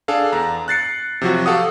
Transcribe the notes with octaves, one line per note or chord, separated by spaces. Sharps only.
D4 G#4 A4 F5
E2 A#5
F#6 A6 C7 C#7
C3 F3 F#3 F#4
G4 A4 F5 F#5 C#6 D#6